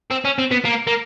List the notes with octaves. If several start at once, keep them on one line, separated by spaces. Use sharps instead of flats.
C4
C#4
C4
B3
A#3
A#3